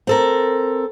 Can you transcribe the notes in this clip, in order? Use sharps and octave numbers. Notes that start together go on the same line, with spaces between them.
C4 A4 A#4